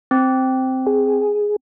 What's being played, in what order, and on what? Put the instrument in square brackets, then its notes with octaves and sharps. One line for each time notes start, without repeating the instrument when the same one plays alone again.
[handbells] C4
[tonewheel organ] G#4